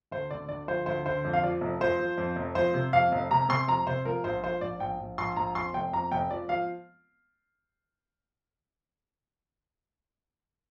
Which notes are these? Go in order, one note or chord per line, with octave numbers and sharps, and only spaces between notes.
D2 C5
D3 D5
D2 D5
F3 C5
D2 C5
D3 C5
F2
F5
F3 D5
F1
F3 C5
F3
F2
F1
F3 C5
C3
F2 F5
F1
C3 A#5
C3 C6
F2 A#5
C3 C5
F3 A#4
A#1 C5
F3 C5
A#1 D5
A#1 G5
A#1
A#1 C6
A#1 A#5
F2 C6
F1 G5
F2 A#5
F1 G5
F3 D5
F3 F5